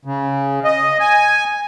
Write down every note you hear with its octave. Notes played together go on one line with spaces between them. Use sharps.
C#3
D#5
G#5